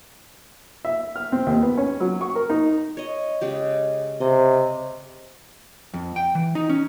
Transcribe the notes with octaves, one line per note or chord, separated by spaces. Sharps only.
E5
F6
C4
D#2
B3
C#4
F#3
C#6
A#4
D#4
C#5 D#5
C#3 G#3 G4
C3 D#5
F2
G5
E3
D#4
C#4